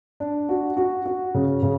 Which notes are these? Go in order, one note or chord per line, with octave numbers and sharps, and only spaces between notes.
D4
F#4
F#4
F#4
C#3
C#3